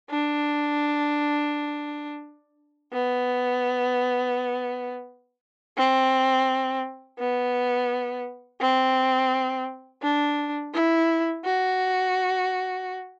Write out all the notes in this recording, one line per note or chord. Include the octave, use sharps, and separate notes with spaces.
D4
B3
C4
B3
C4
D4
E4
F#4